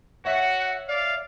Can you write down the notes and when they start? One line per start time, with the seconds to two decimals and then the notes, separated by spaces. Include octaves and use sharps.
0.25 F#4 C#5 E5 F#5 B6
0.88 D5 F5